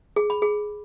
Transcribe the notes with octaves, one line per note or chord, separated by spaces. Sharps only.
G#4
B5
G#4